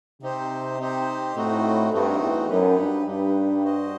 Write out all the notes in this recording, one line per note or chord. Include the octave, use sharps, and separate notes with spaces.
C3 C4 D#4 G4 C5
C4 D#4 G4 C5
A2 A3 C4 D#4 F#4
G2 A3 C4 D#4 F#4
E2
F#2 D#4 G4 B4
G2
G2 D#4 G4 B4
F#4 C5 D#5